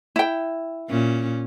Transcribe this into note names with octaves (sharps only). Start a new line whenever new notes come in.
E4 G5
A#2 C#4